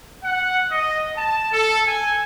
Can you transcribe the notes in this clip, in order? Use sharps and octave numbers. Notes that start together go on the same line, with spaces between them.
F#5
D#5
A5
A4
G#5